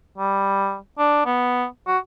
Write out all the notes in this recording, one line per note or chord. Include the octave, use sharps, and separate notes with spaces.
G3
D4
B3
F#4